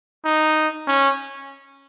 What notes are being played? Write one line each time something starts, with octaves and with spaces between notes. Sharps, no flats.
D#4
C#4